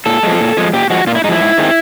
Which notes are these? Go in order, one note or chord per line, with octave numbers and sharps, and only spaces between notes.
A#2 A4
F3 G#3
A#2
F3 G#3
A#2 G4
F3 G#3 F#4
A#2 F4
E4
F3 G#3 D#4 E4
G#2
D#3 G#3 C4